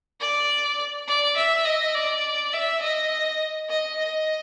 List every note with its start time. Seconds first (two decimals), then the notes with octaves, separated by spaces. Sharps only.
0.20 D5
1.08 D5
1.36 E5
1.65 D#5
1.95 D5
2.53 E5
2.82 D#5
3.69 D#5
3.98 D#5